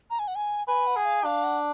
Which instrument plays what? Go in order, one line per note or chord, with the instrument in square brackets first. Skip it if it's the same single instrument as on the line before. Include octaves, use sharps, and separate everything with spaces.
[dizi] A#5
G#5
F#5
G#5
[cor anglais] B4 [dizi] G#5
[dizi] F#5
[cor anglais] G#4
[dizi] F5
[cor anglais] D4 [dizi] F5
[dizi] F#5